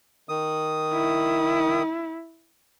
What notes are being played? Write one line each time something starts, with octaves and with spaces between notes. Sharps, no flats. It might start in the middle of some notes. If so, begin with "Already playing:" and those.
D#3 D#6
E4